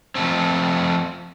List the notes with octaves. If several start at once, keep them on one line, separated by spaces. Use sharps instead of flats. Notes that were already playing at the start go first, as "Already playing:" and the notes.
F2 A#2 A3 C4